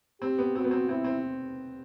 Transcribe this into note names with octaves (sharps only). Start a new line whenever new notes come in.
C4 G4
B3
C4 F#4
B3
C4
C4 E4
C4